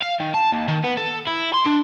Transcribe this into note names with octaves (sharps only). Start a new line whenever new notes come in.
F5
D#3
A5
D#2
D#3
B3
A4
E4
C6
D4